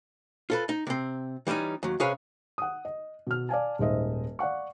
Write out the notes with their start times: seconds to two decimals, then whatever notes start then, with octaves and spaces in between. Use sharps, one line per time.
0.50 F4 A4 B4
0.69 D#4
0.87 C3 C4
1.47 E3 G3 A#3 C#4 D#4
1.83 D#2 F#3
2.00 C3 C#4 G#4 B4 C#5 F5
2.58 F#5 D#6
2.85 D#5
3.27 B2 F6
3.49 D5 F5 G#5 A5
3.79 D#1 G#2 C5 D#5 E5
4.39 D5 F5 F#5 C#6